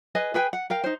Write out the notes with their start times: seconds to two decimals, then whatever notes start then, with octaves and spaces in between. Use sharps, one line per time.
0.15 G#4 B4 D#5 G#5
0.34 G#4 B4 G5 G#5
0.53 F#5
0.70 A#4 F5 G5
0.84 D#4 C5